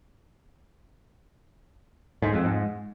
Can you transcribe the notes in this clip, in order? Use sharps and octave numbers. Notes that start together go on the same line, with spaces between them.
G#2
F2
G#2